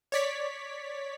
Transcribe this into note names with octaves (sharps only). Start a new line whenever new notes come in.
C#5 D5 B6